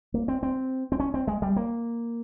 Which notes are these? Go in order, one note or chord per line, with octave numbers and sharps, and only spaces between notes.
A#3
C4
C4
C4
C#4
C4
G#3
G3
A#3